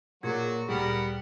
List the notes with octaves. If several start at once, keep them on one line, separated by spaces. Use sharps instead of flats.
A#2 F#3 F#4 G#4 G#6
D2 A#2 G3 B3 G#4 A#4 F#5